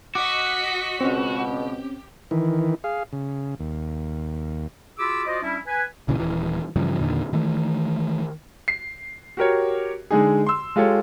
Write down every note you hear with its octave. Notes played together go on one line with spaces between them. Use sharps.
F#4 D#5 D6 B6 C#7
C#2 B2 C4 C#4 G4
D#3 E3
G#4 F5
C#3
D#2
F4 F#4 G#4 B5 D6 E6
F4 F#4 C5 D5 D#5
G3 C#4 D4 E4
B4 G#5
F#1 A#2 C#3 E3
D#1 E3
G2 C#3 E3 F3
E2 A#2 D3 D#3
D#3 E3 A3
C7
F#4 G4 A#4 C#5
D3 G#3 D#4 G#4
C6 E6
G#3 F4 G4 A4 C#5